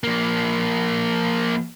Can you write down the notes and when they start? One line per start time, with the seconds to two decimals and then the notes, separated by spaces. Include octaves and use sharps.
0.04 F3 A#3